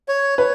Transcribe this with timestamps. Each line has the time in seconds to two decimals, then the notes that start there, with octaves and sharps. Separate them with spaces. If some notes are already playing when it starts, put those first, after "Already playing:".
0.08 C#5
0.38 B4 C#5